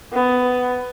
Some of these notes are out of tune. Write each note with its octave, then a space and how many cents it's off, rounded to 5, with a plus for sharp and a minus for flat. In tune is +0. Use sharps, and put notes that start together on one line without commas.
B3 +15